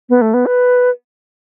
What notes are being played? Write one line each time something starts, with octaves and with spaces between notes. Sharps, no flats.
B3
A3
B3
B4